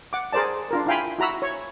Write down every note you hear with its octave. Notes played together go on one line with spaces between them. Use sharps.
F#5 D6
G#4 A#4 C5 D5 A5
D4 F4 A#4
E4 F4 F5 G5 G#5 B5
E4 F#4 A#5 B5 E6
C#5